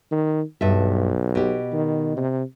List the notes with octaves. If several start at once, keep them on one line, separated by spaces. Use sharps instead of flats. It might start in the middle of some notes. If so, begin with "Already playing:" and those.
D#3
B1 G2 E5
B2 G4
D#3
C3